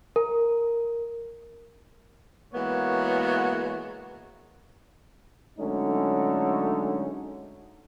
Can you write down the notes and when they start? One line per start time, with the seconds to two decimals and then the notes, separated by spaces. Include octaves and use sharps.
0.16 A#4
2.54 E3 G#3 A#3 B3 F#4 C#5
5.58 D3 F#3 G#3 A3 C#4 D#4